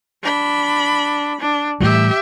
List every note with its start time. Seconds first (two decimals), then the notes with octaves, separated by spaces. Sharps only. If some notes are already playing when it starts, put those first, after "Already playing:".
0.23 D4 B5
1.41 D4
1.80 A2 E3 G3 G4 E5